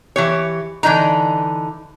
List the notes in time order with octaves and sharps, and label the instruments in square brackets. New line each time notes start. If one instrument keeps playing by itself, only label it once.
[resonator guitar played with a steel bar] E3 G4 C#5
D3 E3 D4 D#4 A#5